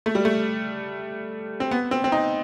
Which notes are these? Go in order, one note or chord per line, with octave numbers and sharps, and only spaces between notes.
A3
G3
A3
C4
B3
C4
C4
D#4